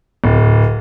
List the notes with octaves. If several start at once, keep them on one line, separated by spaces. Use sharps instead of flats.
D1